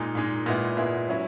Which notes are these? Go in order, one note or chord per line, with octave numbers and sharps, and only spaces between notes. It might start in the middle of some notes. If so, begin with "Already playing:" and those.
Already playing: A#2 G#3 D#4
A#2 G#3 D#4
A#2 G#3 B3 E4
A#2 G#3 B3 E4
F#3 C#4 E4